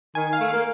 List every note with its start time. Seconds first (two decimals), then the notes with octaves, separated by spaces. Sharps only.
0.15 D#3 G#5
0.33 F5
0.40 A3
0.48 A#3 F5